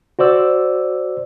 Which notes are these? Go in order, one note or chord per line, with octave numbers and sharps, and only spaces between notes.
F#4 C5 D5 E6